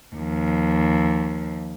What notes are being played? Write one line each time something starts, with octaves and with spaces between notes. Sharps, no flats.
D#2 F3